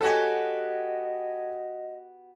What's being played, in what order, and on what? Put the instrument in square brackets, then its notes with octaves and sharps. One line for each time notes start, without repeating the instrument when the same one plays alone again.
[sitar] B3 F#4 G4 [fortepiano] A4 C#5 G#5 [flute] D#5